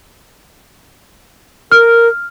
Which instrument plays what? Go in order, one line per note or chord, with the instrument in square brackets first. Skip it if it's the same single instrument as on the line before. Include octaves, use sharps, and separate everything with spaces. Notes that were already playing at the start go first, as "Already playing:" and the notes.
[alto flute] A#4 [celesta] F6